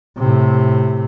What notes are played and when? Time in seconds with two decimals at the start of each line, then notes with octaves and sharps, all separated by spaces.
0.18 A2 C3